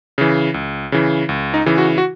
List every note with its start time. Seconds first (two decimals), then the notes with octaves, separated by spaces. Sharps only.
0.18 C#3 E3
0.54 C#2
0.92 C#3 E3
1.29 C#2
1.54 D#4
1.66 C#3 E3
1.78 F#4
1.98 F#4